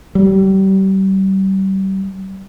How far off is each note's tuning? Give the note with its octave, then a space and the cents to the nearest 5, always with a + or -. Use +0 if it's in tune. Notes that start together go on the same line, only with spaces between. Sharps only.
G3 -30